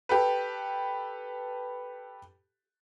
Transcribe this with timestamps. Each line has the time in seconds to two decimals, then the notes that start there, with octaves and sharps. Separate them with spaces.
0.09 G4 A4 B4